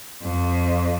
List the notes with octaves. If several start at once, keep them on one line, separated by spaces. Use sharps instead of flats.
F2